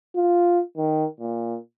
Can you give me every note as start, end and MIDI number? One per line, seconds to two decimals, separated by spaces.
0.16 0.60 65
0.77 1.05 51
1.20 1.56 46